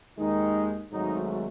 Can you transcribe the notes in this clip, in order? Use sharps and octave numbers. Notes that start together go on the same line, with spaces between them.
D#2 D#3 G#3 D#4
G#1 G#2 F#3 A3 D#4